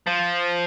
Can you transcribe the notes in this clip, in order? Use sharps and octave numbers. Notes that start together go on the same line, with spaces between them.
F3